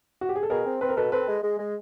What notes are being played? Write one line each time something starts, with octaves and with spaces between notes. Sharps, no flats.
F#4
G4
G#4
A4
B2 G#4 A#4
C4
C4 B4
A#4
B2 A4 B4
C4 A4 B4
G#3
G#3
G#3